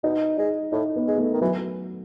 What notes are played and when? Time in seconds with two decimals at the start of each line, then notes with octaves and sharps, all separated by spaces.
0.04 B2 D#4
0.38 G#3 D#4
0.72 A2 D#4
0.96 B3
1.07 G#3
1.18 A3
1.33 D#3
1.41 E3 F#3